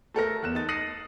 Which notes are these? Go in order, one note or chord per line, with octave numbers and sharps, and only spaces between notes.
A3 A4 A#4 A#6
E2 F#6 E7
D#4 A6
D#6 A#6 C7 C#7 D#7 F#7